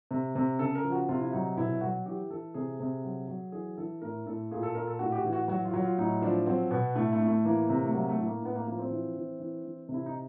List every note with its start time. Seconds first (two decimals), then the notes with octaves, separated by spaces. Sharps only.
0.11 C3
0.35 C3
0.59 C#3 A4
0.75 A#4
0.84 F3
0.92 F#4
1.09 C3 F4
1.20 E4
1.32 F#3 D#4
1.57 B2 E4
1.81 F#3 F#4
2.05 E3 G4
2.30 E3 A4
2.54 C3 G#4
2.80 C3 G#4
3.04 F#3
3.28 F#3
3.52 E3 G#4
3.77 E3 A4
4.02 A2 A#4
4.26 A2 A4
4.51 A#2 G#4
4.63 A4
4.75 A#2 A#4
4.87 A4
4.99 A2 F#4
5.12 G4
5.15 F#4
5.24 E3
5.33 F#4
5.48 F#3 F#4
5.65 F4
5.73 F#3
5.82 F4
5.98 A2 D#4
6.22 F3 D4
6.46 F#3 C4
6.71 B2 B3
6.95 A2 A3
7.12 A3
7.20 A2
7.28 A3
7.45 E3 A#3
7.69 C3
7.85 A3
7.94 F#3 A#3
8.09 A3
8.18 A2
8.26 A#3
8.42 A2 B3
8.55 A#3
8.67 F3 A#3
8.78 C4
8.91 E3
9.16 E3
9.40 E3
9.65 E3
9.89 C3
9.94 E4
10.06 D#4